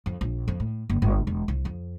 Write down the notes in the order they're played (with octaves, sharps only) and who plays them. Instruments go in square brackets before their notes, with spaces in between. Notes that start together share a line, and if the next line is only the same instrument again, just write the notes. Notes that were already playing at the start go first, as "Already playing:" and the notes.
[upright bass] F2
A#1
F2
A2
F#1
G1
E1
C2
F2